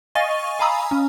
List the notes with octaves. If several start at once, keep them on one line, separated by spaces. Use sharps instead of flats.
D#5 F5 G#5 C#6 A6 D#7
F5 G#5 A#5 B5 D#6 E6
C#4